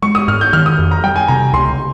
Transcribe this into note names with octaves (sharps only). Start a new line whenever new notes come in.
G#3 C#6
D#6
G#2 F6
G6
D#3 F6
D#6
F2
A#5
G3 G5
G#5
C3 A#5
C#2 C6